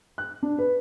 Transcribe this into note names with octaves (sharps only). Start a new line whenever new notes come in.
F#6
D4
B4